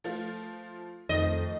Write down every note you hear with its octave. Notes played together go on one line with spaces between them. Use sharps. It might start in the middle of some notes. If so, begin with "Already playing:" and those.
F3 A3 F4
F2 D#3 A3 D#5